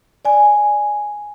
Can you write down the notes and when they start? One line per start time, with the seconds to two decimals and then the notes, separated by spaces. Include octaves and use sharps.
0.25 D5 G#5